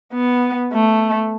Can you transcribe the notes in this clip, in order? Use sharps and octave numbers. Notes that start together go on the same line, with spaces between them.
B3
A3